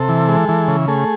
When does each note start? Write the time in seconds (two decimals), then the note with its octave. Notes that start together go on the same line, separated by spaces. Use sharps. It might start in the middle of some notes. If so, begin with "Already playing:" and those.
Already playing: C3 A4
0.09 E3
0.28 G#3
0.49 E3
0.68 C#3
0.88 A3 G#4